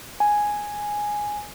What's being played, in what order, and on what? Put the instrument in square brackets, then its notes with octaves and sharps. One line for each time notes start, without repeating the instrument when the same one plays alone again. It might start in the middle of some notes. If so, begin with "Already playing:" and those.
[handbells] G#5